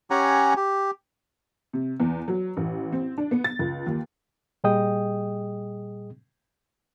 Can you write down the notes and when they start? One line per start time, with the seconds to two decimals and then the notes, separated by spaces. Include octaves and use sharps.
0.11 C#4 G4 C#5 F#5 G#5 A#5
0.56 G4
1.73 C3
2.00 E2
2.28 F#3
2.57 A1
2.92 C4
3.18 D4
3.31 B3
3.44 A6
3.59 C#2
3.87 D#2
4.64 A#2 G3 G#4 D#5 G5 D#6